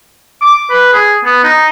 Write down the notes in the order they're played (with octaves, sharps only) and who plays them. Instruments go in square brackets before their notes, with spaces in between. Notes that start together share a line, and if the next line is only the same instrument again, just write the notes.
[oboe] D6
B4
G#4
B3
D#4